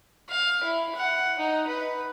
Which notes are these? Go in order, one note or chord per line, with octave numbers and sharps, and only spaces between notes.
F5
E4
F#5
D#4
B4